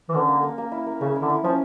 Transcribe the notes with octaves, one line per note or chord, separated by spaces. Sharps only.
E3
D3 C#4
A#3
A#3
A#3
E4
A#3
C#3 C#4
E4
D3
E4
F3 C#4